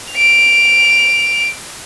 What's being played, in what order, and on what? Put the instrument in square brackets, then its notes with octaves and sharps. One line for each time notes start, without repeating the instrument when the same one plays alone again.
[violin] D7 F7